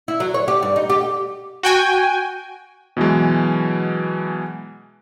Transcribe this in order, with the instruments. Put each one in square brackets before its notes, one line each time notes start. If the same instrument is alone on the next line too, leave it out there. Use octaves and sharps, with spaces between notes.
[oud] E4
F#3
C#5
G4
G2
D#4
G4
[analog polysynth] F#4 G5 G#5
[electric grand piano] B2 E3 F#3 G#3